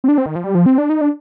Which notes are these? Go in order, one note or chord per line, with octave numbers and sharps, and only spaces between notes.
C4
D4
C4
D#3
F3
G3
F3
C4
D4
D#4
D4